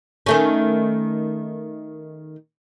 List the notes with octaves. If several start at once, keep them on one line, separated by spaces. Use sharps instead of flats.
D#3 A3 C#4